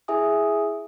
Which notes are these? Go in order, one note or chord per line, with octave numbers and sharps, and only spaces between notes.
E4 G#4 E5 G#5 D#6